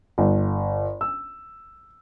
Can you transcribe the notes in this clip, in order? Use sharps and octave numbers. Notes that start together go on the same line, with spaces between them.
G1
E6